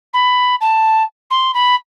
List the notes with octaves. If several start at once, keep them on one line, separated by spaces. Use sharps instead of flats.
B5
A5
C6
B5